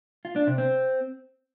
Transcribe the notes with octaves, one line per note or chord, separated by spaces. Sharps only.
F4
D4
C3
C4